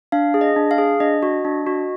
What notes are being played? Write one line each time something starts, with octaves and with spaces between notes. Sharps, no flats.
D4 F5
G#4
D#5
D4
F5
G#4
D4 D#5
F#4
D4
F#4